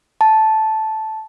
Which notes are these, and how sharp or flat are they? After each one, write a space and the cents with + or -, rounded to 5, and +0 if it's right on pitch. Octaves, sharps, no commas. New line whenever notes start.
A5 -10